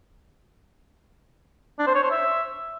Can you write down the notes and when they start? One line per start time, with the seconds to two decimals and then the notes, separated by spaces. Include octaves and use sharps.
1.79 D4
1.87 C5
1.95 C#5
2.03 C5
2.11 E5